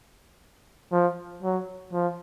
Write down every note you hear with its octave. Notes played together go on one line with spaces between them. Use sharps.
F3
F#3
F3